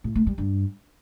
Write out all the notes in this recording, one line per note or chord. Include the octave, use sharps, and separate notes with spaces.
A2
A3
G3
G2